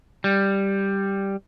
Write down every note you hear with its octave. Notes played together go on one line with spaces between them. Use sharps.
G3